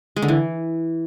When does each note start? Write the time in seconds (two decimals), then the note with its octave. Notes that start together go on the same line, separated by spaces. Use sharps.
0.16 G#3
0.22 D3
0.28 E3